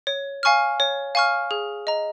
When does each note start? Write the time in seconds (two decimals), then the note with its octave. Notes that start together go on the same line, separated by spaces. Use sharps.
0.07 C#5
0.43 F5 G#5 C#6 F6
0.80 C#5
1.15 F5 G#5 C#6 F6
1.51 G#4
1.87 D#5 A#5